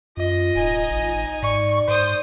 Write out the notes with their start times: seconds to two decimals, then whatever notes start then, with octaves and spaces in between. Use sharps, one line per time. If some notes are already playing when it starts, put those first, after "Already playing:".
0.17 F#2 F4 D#5
0.55 D1 D#4 G#5
0.90 G#1
1.43 G#2 D5 C#6
1.88 G#2 C5 D#6